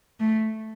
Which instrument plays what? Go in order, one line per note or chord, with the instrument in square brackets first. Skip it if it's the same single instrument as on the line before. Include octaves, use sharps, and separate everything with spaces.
[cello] A3